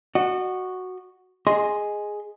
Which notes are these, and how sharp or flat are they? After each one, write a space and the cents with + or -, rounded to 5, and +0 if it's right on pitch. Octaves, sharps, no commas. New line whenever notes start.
F#4 +0 D#5 -40
G#4 +0 D#5 +0 C6 +0